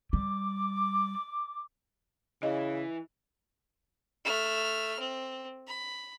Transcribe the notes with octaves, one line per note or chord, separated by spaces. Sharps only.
G3 D6
C#3 E3 E4 D#5
A3 F6
C4
B5